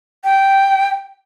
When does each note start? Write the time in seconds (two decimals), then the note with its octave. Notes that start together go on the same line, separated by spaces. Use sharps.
0.24 G5